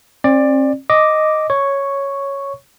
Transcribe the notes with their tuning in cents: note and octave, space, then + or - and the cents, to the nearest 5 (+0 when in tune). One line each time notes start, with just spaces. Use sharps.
C4 +45 D5 +15
D#5 +0 D6 +0
C#5 +0 C#6 +0